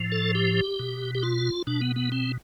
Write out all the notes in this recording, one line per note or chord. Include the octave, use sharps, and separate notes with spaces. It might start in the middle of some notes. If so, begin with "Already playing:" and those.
Already playing: A2 F3
A4
G4
B2
G4
F4
B2 D4
B3
B3
C4